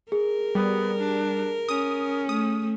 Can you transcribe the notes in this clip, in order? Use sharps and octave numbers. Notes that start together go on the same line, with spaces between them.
G#4 A#4
G3 B3
D4
C#4 D#6
A3 D#6